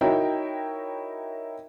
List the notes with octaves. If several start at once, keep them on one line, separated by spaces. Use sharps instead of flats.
D#4 E4 F#4 A#4 C#5 G5